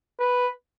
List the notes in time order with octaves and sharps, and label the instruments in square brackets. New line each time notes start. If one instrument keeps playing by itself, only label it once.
[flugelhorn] B4